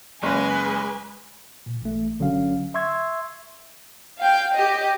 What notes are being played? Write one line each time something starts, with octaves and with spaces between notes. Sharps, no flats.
F#1 G#3 B4 G#5
A#2
A1 A3
G1 D3 F#3 C#4 F5
E5 C6 C#6 E6 G#6
F5 G5
G4 D#5